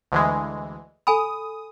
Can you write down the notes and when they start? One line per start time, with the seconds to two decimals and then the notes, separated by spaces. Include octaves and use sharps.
0.12 D2 E3 G#3
1.07 A4 G#5 B5 D#6